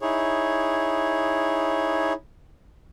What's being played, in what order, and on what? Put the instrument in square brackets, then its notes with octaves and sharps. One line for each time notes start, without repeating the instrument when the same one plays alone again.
[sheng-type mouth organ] D#4 E4 G#4 C#5